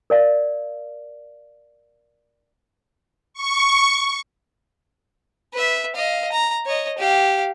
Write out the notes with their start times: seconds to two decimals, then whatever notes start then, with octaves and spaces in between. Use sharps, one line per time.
0.10 A#4 D5 F5
3.34 C#6
5.53 B4 E5
5.95 D#5 F5
6.32 A#5
6.66 C#5 D#5
6.98 G4 F5